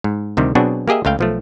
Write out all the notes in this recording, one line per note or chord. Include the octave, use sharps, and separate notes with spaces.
G#2
D2 C3 D#3 G3
B2 F#3 C4 D4 F#4 G#4
A#3 G4 G#4 D#5 E5
C#2 A3 F5 G5
B1 F3 A3